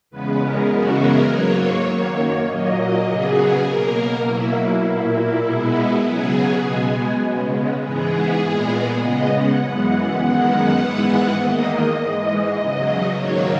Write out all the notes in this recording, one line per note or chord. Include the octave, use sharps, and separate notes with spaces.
E2 C#3 G#3 B3 B4
A#4
F#2 C#3 E3 G#3 B3 F#4
A#4
G#2 F#3 A#3 C#5
C#5
F#2 D#3 A#3 C#5
A#2 F#3 A#3 D#5
D#5
C#3 F#3 B3 G#4
B2 A#3 A#4
B2 F#3 A#3 E4
E4
A#2 A#3
B2 G#3 B3
C#3 F#3 B3 G#4
B2 G#3 B3
C#3 G#3 B3
G#2 E3 G#3 B3 G#4
A#2 G#3 B3
C#3 G#3 B3 D#5
F#5
F#2 E3 G#3 B3 F#5
F#5
F#2 D#3 G#3 B3 F#5
G#2 E3 G#3 B3
E2 D#3 A#3 D#5
G#2 E3 G#3
E2 C#3 F#3
G#2 D#3 F#3 A#3 C#5